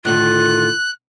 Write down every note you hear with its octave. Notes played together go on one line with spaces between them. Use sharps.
A2 D3 D#3 F4 F#6